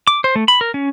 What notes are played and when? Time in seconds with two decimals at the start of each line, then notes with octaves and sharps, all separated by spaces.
0.07 D6
0.24 C5
0.36 A3
0.48 B5
0.61 A#4
0.74 C#4